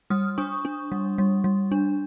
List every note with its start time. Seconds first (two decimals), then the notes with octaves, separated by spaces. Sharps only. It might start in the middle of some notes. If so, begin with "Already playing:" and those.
0.10 G3 D#6 F6
0.38 D4 C#6 D#6
0.65 D4
0.92 G3
1.18 G3
1.44 G3
1.72 D4